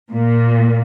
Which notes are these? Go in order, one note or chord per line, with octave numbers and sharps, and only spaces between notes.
A#2